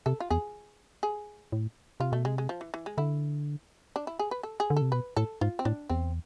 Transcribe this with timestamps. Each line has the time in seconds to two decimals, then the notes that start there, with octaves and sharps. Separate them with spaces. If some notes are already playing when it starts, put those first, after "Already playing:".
0.06 C3 A4
0.20 F4
0.30 E2 G#4
1.03 G#4
1.52 A2
2.00 C3 F4
2.12 B2 A3
2.25 C3 G#3
2.38 G#3
2.49 F3
2.61 E3
2.74 E3
2.86 G#3
2.98 D3 E4
3.96 D4
4.07 E4
4.19 G#4
4.31 B4
4.43 A4
4.60 G#4
4.70 D3
4.76 A4
4.82 C3
4.92 B2 B4
5.16 A2 A4
5.41 G#2 F4
5.59 C4
5.65 A2 D4
5.89 E2 C4